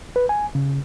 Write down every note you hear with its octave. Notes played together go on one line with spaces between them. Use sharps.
B4
G#5
C#3